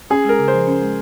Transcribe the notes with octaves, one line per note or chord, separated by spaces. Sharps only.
C#4 G#4
G#3 A#4
C#3
C5
F3
C#4
G#3